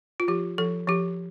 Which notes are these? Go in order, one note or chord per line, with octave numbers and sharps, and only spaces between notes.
F4
F3 G4
F3 A4
F3 G4